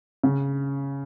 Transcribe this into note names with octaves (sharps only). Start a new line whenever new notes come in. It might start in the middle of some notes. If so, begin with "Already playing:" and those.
C#3